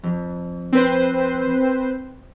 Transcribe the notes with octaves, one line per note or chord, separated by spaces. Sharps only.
F2
C4 B4 C5